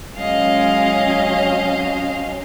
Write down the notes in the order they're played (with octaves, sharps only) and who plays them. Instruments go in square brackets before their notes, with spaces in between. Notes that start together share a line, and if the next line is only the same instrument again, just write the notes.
[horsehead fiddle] F#3 C#4 [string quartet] G#3 [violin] D#5 F5